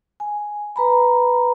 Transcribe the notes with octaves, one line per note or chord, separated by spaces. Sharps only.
G#5
B4 A#5 B5